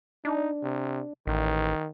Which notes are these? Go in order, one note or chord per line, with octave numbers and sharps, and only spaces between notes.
D4 D#4
C3
A1 D#3